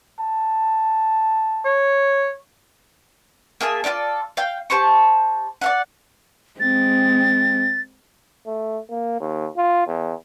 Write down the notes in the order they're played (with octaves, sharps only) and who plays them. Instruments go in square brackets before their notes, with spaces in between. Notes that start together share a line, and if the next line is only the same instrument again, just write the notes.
[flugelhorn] A5
[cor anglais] C#5
[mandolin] A#3 G#4 E5 A5
F4 F#4 A4 D5
F5 G5
G4 C5 A5 C#6
D5 F5 F#5
[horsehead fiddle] G#3 C4 [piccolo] A6
[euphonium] A3
A#3
D#2
F4
E2